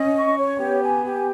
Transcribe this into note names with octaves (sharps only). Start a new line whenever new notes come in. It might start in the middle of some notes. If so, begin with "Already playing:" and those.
Already playing: C#4 D#5
C#6
C#5
B3 G4
G#5
G4